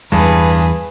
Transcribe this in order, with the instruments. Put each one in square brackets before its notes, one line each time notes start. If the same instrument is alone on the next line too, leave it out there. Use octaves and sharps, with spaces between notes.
[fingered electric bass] E2 E3 [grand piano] G2 [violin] G#4 B4